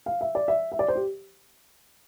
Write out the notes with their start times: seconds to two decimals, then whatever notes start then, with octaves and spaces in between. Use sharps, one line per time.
0.06 F5
0.21 E5
0.35 D5
0.48 E5
0.72 E5
0.79 D5
0.88 C5
0.95 G4